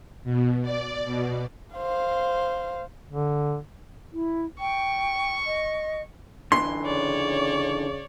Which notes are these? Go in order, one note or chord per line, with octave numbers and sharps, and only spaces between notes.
B2
D5
B2
C5 F5
D3
E4
G5 C#6
D#5
D3 E3 C6
C#3 C#5 D5